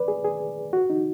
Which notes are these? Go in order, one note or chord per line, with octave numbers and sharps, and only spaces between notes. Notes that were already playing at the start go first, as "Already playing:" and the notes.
Already playing: B4 D5
G#4
G#4
F#4
D#4